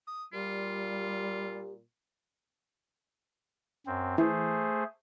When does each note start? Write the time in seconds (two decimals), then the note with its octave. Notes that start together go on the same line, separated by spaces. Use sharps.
0.07 D#6
0.33 A#2 G3 F4 G4
3.87 F#2 C4
4.18 E3 A3 G#4 C5